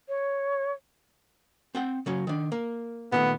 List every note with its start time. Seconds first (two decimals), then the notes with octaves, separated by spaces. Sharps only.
0.08 C#5
1.75 C4 F#5 G5
2.06 C#3 F#3 C#4
2.27 D#3 D4
2.52 A#3 A#4
3.12 A#2 D#3 A3 B3